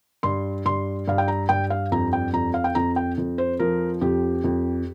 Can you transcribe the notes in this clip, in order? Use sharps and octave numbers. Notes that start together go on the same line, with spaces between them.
G2 C6
G2 C6
G2 F5
G5
A#5
G2 G5
F5
F2 A#5
G5
F2 A#5
F5
G5
F2 A#5
G5
F2
C5
F3 A#4
F2 G4
F2